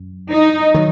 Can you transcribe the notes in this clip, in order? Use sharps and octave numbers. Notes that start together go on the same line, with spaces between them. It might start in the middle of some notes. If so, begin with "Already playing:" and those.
Already playing: F#2
D#4
D#3 F#3